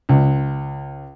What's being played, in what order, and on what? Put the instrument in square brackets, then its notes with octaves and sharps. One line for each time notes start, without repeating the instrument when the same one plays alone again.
[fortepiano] C#2